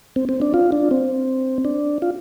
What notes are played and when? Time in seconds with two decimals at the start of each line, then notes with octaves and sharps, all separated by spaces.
0.16 C4
0.29 C4
0.42 D4
0.54 F4
0.72 D4
0.91 C4
1.65 D4
2.02 F4